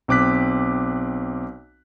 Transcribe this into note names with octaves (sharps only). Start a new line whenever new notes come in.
B1 C4 D6 F#6 B6